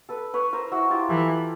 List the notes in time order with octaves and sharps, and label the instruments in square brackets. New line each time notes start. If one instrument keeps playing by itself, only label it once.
[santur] A4 B4
B4 C#5
A#4 C5
E4 F#4
F4 G4
[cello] E3 [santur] G4 A4